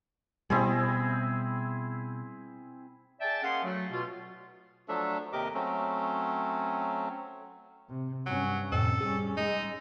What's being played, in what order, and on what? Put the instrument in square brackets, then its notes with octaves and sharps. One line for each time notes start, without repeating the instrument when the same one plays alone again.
[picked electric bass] B2 G3 [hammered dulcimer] C4 E4 G#4
[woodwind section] G#4 D5 E5 G5 A5
A#3 C#4 G#4 F#5 C6 D#6
F#3 A3
B2 F4
[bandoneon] F3 F#3 A3 D4 A4 E5
D#2 C3 G4 A#4 D#5 D6
F#3 A3 C4 C#4
[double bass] C3
[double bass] G2 C#4 [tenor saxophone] F#3
[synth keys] F2 A2 C3 [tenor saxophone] A4
[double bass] G3 C#4 [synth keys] G#4
[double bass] G#3 [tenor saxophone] D#4